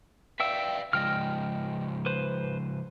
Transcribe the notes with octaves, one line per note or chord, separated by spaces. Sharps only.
B4 D5 E5 F5 G5 E6
C#3 F3 G#3 D#5 G5 F6
B4 C5